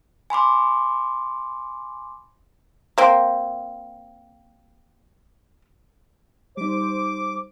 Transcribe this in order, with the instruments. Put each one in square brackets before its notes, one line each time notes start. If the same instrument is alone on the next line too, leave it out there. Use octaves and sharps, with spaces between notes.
[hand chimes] G#5 B5 C6 D6
[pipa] A#3 C4
[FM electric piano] G3 D#4 [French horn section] C5 [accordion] D6